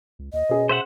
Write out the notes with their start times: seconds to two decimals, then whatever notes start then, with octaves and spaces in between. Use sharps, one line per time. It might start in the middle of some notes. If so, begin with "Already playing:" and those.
0.19 C#2
0.33 D#2 D#5
0.49 B2 C#4 G#4 B4
0.69 C5 E5 F#5